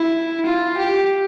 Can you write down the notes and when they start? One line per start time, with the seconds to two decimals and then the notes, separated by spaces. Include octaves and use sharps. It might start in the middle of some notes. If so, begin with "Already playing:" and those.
Already playing: E4
0.46 F4
0.77 G4